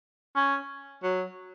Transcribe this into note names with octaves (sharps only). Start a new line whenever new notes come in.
C#4
F#3